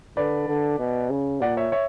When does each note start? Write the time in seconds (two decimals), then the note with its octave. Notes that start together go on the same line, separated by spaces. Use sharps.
0.17 D3 B4 D5
0.48 D3
0.79 B2
1.10 C#3
1.41 A#2 D5 F#5
1.57 C#5 E5
1.72 C#5 E5